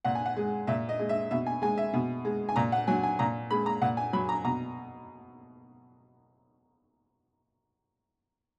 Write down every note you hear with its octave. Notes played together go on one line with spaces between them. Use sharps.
A#2 F#5
G#5
F#5
G#3
A#2 E5
D#5
G#3
E5
B2 E5
G#5
G#3 G#5
E5
B2
G#3
G#5
A#2 A#5
F#5
F#3 G#5
G#5
A#2 A#5
G#3 B5
A#5
A#2 F#5
G#5
F#3 B5
A#5
B2 A#5